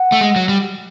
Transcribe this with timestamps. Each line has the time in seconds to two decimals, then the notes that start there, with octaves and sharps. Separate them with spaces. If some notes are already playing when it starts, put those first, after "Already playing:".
Already playing: F#5
0.12 A3
0.21 G#3
0.36 F#3
0.49 G3